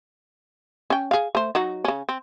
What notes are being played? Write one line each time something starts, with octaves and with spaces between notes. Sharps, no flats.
C#4 G5
G#4 F5
A3 C5
F#3 D#4 F#4
C#3 C#4
C4